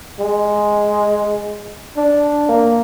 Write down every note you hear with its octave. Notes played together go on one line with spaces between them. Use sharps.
G#3
D4
A#3